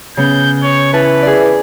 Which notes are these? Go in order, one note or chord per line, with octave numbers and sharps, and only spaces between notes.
C#3 B3 G6
C#5
E3 B4 A5
G#4 D5